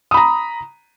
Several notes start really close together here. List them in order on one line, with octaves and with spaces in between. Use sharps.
D#6 B5 A#5